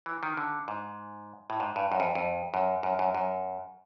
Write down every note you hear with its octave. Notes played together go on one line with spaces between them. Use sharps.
E3
D#3
D3
G#2
A2
G#2
G2
F#2
F2
F2
F#2
F#2
F#2
F#2